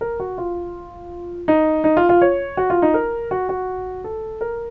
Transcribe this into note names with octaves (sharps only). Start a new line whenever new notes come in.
A#4
F#4
F4
D#4
D#4
F4
F4
C#5
F#4
F4
D#4
A#4
F#4
F#4
A4
A#4